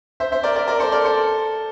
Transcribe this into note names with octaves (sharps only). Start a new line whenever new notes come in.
C5 E5
C5 E5
A#4 D5
A#4 D5
A#4 D5
A4 C5
A#4 D5
A4 C5